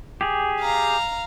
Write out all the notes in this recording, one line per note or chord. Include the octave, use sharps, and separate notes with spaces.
G4 G#4
F5 A#5